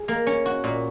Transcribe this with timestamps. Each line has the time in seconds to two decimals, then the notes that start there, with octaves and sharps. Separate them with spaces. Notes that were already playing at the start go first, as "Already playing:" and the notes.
Already playing: G#4
0.08 A#3
0.27 C#4
0.46 F#4
0.64 A#2